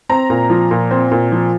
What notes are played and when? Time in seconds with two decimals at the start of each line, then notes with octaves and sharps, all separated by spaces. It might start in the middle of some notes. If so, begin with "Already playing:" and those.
0.09 C4 A#5
0.30 A#2
0.50 F3
0.71 A#2
0.91 C4
1.12 A#2
1.32 F3